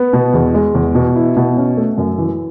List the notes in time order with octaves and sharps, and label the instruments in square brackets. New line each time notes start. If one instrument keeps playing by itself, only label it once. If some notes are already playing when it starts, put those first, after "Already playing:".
Already playing: [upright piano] B3
B2
E2
G#3
E2
B2
E4
B2
C#4
A3
F#2
E3